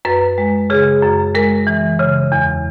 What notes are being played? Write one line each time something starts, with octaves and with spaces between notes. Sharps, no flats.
F#2 B4
G#3
C#3 G#4
F#2
G#3 A#4
E3
C#3
E2